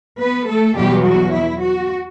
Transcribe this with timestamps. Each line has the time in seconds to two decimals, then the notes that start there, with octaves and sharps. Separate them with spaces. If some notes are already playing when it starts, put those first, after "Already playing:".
0.19 B3 B4
0.48 A3 A4
0.76 E2 B2 F#3 G3 G4
1.05 F#4
1.34 E4
1.62 F#4